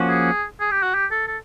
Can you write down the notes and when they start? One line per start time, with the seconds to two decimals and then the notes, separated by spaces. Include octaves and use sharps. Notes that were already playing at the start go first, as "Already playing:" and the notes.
Already playing: F3 A#3 C#4 F#4
0.08 G#4
0.60 G#4
0.71 G4
0.82 F#4
0.94 G4
1.11 A4
1.27 A4